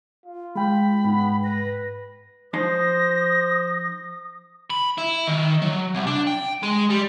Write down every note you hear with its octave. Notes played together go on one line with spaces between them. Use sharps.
F4
G#3 G5 B5
G#2 B3
B4 A#6
F3 D#4 C5 C6 D#6 A#6
B5
E4
D#3
F#3
C2
D4
G5
G#3
G3